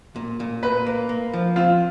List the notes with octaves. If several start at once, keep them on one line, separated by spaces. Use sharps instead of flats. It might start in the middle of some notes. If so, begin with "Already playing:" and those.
A#2
A#2
A#2 B4
A#3
A#3
F3
C4 F4